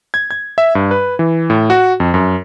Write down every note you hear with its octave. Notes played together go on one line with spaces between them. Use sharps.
G#6
G#6
E5
G2
B4
E3
A2
F#4
F2
F#2